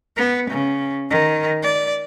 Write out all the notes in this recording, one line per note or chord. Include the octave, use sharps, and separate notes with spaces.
B3
C#3
D#3
D5